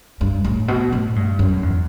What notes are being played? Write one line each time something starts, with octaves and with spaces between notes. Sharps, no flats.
G2
A2
B2
A2
G2
F#2
E2